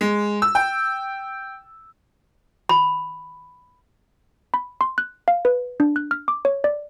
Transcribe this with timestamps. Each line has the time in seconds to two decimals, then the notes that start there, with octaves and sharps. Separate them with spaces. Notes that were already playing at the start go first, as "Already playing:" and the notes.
0.01 G#3
0.42 E6
0.55 G5
2.69 B5
4.54 B5
4.81 C6
4.98 F#6
5.28 F5
5.45 B4
5.80 D4
5.96 F#6
6.11 F6
6.28 D6
6.45 C#5
6.64 D5